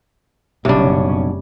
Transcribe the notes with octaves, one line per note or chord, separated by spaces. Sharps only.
F#1 B1 C3 G3 C#4 D4